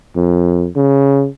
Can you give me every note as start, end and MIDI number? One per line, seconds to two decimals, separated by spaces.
0.16 0.67 41
0.76 1.27 49